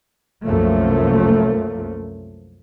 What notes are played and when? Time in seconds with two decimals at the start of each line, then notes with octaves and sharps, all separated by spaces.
0.45 C2 F#2 F3 A3 A#3